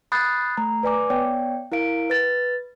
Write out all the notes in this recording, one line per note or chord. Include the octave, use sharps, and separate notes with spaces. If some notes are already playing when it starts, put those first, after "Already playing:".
B5 D#6 F#6 G6 A6 C7
A3 A#5
B4 D5 G#5 D6
B3 C#5 D5 G5
E4 A#4 F5 D7
B4 A6